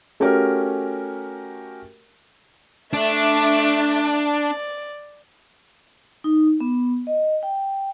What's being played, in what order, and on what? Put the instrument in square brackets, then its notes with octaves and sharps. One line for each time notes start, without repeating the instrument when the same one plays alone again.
[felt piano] A3 C#4 F#4 G4 A#4
[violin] A3 E5 [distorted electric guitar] D4
[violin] D5
[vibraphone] D#4
B3
D#5
G5